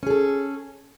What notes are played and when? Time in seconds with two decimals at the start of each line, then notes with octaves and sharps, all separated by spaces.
0.03 C#4
0.07 G#4
0.10 A4